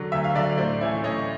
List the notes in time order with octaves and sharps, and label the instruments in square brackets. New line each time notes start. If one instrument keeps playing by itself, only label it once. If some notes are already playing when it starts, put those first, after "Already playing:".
Already playing: [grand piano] D3 F#3
D2 E5
F5
D3 F#3 D5 E5
A2 C5 D5
E3 A3 C#4 E4
A2 C#5 D#5